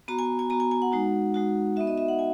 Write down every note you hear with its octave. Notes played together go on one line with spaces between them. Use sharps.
B3 F#4 A#5
G#5
G#5
B3 F#4 A#5
G#5
G#5
F#5
G#3 D#4 F#4
G#3 D#4 F#4
B3 D#4 F#4 E5
D#5
E5
F#5
B3 G#5